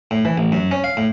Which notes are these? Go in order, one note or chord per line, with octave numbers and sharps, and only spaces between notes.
A2
E3
A1
F#2
C#4
F5
A2